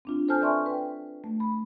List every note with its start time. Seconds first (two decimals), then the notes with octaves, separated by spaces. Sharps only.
0.05 C4 D4 F4
0.28 A4 C5 G#5 A5 F6 G6
0.41 B4 D5 E5 G#5 C6 C#6
0.66 B4 G5
1.24 A3
1.40 B5